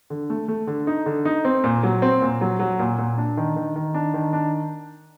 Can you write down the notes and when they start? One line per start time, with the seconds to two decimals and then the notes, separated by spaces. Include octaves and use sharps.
0.10 D3
0.30 A3
0.48 A3
0.67 D3
0.87 D#4
1.06 D3
1.25 D#4
1.45 C4
1.64 A#2
1.83 F#3
2.02 C4
2.22 A#2
2.41 F#3
2.59 F#3
2.79 A#2
2.98 A#2
3.17 D4
3.37 D#3
3.56 D#3
3.76 D#3
3.94 D4
4.14 D#3
4.33 D4